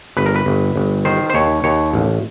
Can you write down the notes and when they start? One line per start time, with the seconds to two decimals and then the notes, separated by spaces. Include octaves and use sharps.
0.17 G1 B4
0.26 A#4
0.36 B4
0.46 G1
0.76 G1
1.05 D#3 C5
1.30 C5
1.34 D#2 C#5
1.64 D#2 C#5
1.93 A1